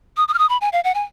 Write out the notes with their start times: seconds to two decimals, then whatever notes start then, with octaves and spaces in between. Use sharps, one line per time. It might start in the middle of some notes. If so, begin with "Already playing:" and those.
0.17 D#6
0.28 D#6
0.34 F6
0.39 D#6
0.50 B5
0.61 G#5
0.73 F5
0.84 F#5
0.95 G#5